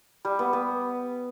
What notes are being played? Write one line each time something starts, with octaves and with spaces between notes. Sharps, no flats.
G3
B3
B3